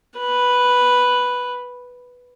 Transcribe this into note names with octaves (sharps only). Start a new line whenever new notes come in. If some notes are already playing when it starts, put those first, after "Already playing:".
B4